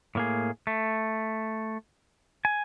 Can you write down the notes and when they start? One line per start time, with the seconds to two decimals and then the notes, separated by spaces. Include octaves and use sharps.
0.15 A2 A#3 G#4
0.67 A3
2.45 G#5